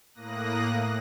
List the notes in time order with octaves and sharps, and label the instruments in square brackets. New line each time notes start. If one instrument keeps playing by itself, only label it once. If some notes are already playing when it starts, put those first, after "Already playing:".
[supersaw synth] A2 A#3 D#6 F#6 A#6